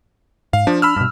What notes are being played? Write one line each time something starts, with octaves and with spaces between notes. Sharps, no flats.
G#2 F5
F3 D4
B5 E6 F6
G2 B2